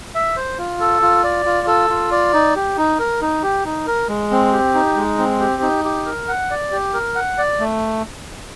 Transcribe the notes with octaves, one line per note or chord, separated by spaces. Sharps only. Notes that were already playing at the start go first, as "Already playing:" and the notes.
E5
C5
F4
A4
F4
D5
F4
A4
F4
D5
D#4
G4
D#4
A#4
D#4
G4
D#4
A#4
G#3
C4
G4
D#4
G#3
C4
G4
D#4
G4
A#4
F#5
D5
G4
A#4
F#5
D5
A3